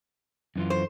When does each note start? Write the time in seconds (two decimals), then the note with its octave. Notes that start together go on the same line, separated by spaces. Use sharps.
0.56 F#2 E3 F4
0.70 C5